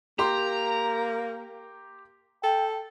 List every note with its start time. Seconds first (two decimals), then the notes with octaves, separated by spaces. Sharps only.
0.19 A#3 G4 A#5 C6
2.44 A4 G5